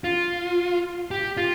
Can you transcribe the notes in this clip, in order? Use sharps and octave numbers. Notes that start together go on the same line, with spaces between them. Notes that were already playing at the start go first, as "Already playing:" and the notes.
F4
G4
F4